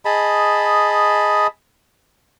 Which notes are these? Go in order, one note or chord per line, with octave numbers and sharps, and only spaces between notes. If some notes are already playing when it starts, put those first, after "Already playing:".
G#4 D#5 A5 B5